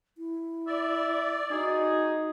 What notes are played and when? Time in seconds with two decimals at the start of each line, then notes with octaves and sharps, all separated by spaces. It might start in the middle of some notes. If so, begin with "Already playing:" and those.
0.18 E4
0.67 D5 E5
1.51 D#4 F#4 G#4